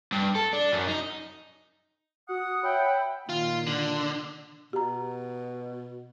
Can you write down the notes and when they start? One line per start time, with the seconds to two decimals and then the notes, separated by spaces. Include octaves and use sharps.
0.13 G2
0.36 A4
0.53 D4
0.73 F#2
0.87 D#4
2.29 F#4 F#5 D#6
2.63 C#5 E5 G5 B5
3.29 A#2 D#3 F4
3.67 D3
4.73 B2 G4 A#5